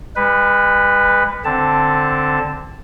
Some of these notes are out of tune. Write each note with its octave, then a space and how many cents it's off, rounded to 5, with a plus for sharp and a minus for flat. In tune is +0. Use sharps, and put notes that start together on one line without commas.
G#3 -45 B4 +0
D3 +0 C4 +0 A5 +0